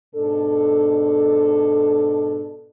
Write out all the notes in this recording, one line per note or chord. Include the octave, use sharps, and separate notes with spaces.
G#2 B2 D4 A4